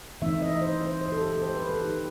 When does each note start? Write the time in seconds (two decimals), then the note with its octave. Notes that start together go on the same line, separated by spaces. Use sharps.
0.22 E3 A3 C4 D#4 E5
0.42 D#5
0.62 C5
0.81 C5
1.01 C5
1.12 A4
1.22 G4
1.32 A4
1.42 C5
1.56 B4
1.69 A4
1.82 C3 E3 A3 D#4 G4